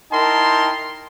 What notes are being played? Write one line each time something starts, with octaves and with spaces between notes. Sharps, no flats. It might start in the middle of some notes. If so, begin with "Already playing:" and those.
D#4 E4 A#4 G5 A5 C6